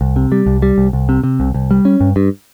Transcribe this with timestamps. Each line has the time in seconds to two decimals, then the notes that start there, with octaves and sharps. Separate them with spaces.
0.01 C2
0.16 C3
0.32 G3
0.46 C2
0.62 G3
0.78 C2
0.93 C2
1.09 C3
1.24 C3
1.40 C2
1.54 C2
1.71 G3
1.85 C#4
2.01 G2
2.16 G2